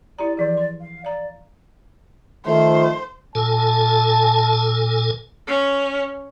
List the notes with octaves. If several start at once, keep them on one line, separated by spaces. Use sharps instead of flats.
E4 G4 D5 A#5
E3 F3 G#4 D5
C6
F5
D5 F5 A#5
D#3 F3 A3 C5
A#2 A4 G#5 A5
C#4